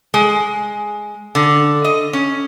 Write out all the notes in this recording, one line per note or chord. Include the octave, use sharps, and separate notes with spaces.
G#3
D3
D#5
C#4